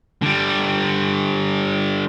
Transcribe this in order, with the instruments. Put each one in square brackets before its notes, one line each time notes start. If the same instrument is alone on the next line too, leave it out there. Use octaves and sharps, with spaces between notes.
[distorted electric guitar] D3 G3